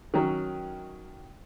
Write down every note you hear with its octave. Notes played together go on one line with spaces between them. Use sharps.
D#3 F#3 C#4